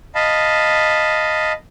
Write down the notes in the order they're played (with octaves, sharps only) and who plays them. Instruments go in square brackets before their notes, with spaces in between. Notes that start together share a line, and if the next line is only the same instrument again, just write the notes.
[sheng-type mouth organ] D#5 F5 A5 B5